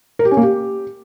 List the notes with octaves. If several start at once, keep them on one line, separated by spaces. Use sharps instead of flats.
A#4
G4
C#4
A#3
G4